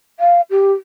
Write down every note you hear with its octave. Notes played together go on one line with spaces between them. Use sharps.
F5
G4